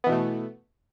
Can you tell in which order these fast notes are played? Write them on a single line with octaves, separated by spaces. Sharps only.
B3 E3 B2 A3